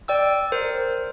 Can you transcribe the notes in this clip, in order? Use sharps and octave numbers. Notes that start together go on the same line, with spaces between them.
D5 G5 E6
A#4 C5